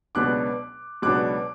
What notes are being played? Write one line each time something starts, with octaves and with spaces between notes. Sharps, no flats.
C#2 B2 F#3 B3 D4 D6 F#6
C#2 B2 F#3 B3 D4 D6 F#6